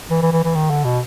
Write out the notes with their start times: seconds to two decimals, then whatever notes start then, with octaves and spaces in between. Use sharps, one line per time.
0.11 E3
0.22 E3
0.32 E3
0.44 E3
0.55 D#3
0.71 D3
0.85 B2